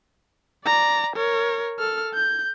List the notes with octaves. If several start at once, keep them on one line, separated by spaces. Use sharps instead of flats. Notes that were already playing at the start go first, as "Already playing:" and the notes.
D5 A#5
A#4 C#5
A4 F6
G6